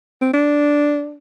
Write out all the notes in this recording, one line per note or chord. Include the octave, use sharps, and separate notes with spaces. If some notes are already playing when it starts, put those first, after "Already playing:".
C4
D4